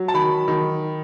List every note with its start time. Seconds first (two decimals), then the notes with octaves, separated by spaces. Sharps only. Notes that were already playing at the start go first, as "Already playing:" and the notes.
Already playing: F#3
0.08 A5
0.14 D#3 B5
0.48 D#3